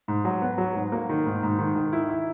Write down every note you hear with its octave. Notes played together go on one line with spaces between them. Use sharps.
G#2
F#3
B3
F#3
G#2
A#3
D#3
G#2
G#2
D#3
D#3
E4
E4